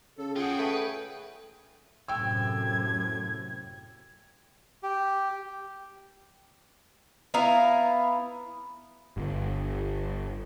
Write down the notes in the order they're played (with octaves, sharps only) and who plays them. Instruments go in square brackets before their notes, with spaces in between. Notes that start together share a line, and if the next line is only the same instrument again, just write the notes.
[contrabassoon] C#3 [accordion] A4
[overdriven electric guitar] F4 F#5 [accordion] G#4 G5
[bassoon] A3 [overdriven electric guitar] B4
[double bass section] F#2 A2 C3 [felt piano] G5 E6 [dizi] G#6
[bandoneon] G4
[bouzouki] B3 E4 F5 A#5
[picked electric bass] G1